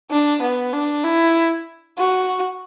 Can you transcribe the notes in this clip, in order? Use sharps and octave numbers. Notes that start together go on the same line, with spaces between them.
D4
B3
D4
E4
F#4